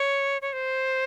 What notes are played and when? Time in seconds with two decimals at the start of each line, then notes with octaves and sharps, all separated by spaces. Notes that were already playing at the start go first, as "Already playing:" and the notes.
Already playing: C#5
0.42 C#5
0.53 C5